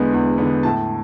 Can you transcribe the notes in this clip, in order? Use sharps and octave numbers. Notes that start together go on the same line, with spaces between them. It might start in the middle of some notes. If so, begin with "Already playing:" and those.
Already playing: E2 D3 G#3 B3
E2
D3 G#3 B3
A2 A5